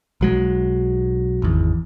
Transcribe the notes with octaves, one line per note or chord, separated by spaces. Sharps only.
B1 F#3 G#3
G#1 E2